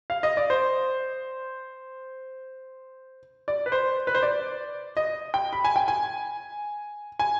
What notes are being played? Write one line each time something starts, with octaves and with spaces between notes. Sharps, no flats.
F5
D#5
D5
C5
D5
B4
C5
B4
C5
D5
D#5
G5
B5
G#5
G5
G#5
G#5